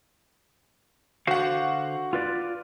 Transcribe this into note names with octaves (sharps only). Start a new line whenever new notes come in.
D3 F#4 C5 F5 F#5
F4 B4 D5